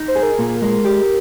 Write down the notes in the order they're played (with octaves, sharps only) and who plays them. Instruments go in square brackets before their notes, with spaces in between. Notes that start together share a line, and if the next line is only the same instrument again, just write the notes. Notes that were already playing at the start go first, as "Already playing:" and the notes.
Already playing: [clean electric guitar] D#4
[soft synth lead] C5
[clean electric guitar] G#4
[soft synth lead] A#4
[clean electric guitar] A#2
G#3
G4